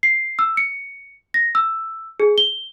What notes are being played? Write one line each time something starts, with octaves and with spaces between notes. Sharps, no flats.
C7
E6
C#7
A#6
E6
G#4
G7